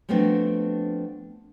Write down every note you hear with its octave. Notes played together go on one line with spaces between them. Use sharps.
F3 A3 B3 C4 D4 F#4